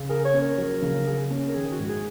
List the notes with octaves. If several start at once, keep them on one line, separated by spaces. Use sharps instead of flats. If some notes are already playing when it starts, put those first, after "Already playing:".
Already playing: C#3
G#4 A#4
C#5
C#4
A#4
F#3
C#3
G#4
C#4
A#4
D#3 G#4
F#4
G#2
G#4